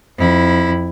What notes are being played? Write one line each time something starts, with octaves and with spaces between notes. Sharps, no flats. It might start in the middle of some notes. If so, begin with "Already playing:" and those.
F2 E4